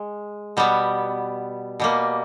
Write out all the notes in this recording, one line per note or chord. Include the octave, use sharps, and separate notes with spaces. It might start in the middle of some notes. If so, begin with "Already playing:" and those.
Already playing: G#3
B2 G3 B3
B2 G3 A#3